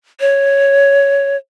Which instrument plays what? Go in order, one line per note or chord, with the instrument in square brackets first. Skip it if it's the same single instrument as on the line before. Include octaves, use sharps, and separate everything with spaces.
[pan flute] C#5